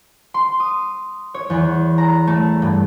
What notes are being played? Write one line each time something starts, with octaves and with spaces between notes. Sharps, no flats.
C6
D#6
C#5
E2
A#5
A3
G2